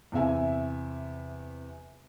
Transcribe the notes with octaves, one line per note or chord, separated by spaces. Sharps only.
E2 C3 E5 G#5